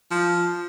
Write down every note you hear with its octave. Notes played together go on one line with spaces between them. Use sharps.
F3